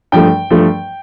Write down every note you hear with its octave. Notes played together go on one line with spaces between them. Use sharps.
G2 F3 A3 G5
G2 F3 A3